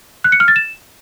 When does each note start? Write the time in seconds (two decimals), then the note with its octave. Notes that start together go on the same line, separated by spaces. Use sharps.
0.24 F#6
0.32 C#7
0.40 F6
0.48 A6
0.56 E7